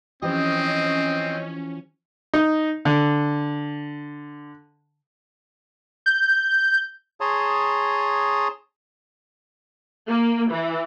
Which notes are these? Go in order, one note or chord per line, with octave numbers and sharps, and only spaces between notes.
E3 F3 C4 C#4 G4 D#5
D#4
D3
G6
G#4 C#5 A5 A#5 C6 D#6
A#3
E3